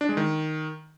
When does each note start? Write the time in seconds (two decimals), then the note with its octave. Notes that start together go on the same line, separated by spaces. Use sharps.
0.01 D4
0.09 G#3
0.17 D#3